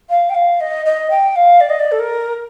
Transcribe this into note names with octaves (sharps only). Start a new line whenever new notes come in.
F5
G5
F5
D#5
D#5
G5
F5
D5
D#5
D5
A4
A#4